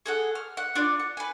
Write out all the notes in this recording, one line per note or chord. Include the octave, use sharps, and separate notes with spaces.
G#4 A4 F#5
F6
F#5
D4 F4 D5
F#5
B4 G#5